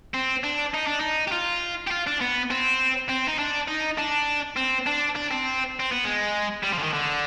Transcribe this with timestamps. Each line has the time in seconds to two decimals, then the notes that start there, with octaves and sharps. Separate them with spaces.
0.14 C4
0.44 D4
0.74 D#4
0.87 D4
1.00 D#4
1.28 G4
1.32 F4
1.87 G4
1.91 F4
2.07 D4
2.21 B3
2.51 C4
3.09 C4
3.28 D#4
3.39 D4
3.68 D#4
3.98 D4
4.56 C4
4.86 D4
5.16 D4
5.31 C4
5.80 C4
5.92 B3
6.05 G#3
6.63 G3
6.72 F3
6.78 D3
6.83 D#3
6.93 D3